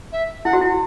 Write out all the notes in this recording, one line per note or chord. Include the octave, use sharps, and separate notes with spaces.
E5
E4 F#5
F#4
E4